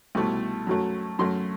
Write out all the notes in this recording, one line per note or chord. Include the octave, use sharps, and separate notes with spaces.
C2 B2 A3
F#2 F#3 A3
F#2 F#3 A3 C6